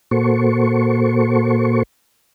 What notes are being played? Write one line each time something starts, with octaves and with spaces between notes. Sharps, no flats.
A#2 A#3 F#4 A4 C5 C#6